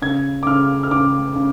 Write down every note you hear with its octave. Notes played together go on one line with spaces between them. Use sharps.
C#3 G#6
D6
C#3 F6
F6
C#3 D6
C#3